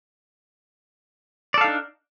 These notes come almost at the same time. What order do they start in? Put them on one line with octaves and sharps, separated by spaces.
D5 A4 F5 D#4 D4